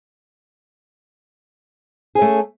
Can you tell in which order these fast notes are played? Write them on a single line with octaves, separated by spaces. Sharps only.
G#4 C#4 A3